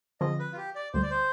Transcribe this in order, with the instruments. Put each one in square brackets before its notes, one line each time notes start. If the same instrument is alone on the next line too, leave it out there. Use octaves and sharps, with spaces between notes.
[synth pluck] D3 F3 C4 F4 G#4 [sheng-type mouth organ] D#5
[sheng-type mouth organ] B4
F4
G4
D5
[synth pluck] D2 D3 G3 [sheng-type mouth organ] C5
[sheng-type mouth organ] D5
C5